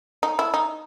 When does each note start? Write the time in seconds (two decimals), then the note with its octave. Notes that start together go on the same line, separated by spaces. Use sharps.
0.23 D#4
0.39 E4
0.54 D#4